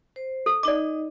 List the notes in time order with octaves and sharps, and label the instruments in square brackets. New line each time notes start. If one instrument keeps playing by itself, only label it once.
[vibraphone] C5
[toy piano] A4
[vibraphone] D#4 D#5 [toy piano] D5 D6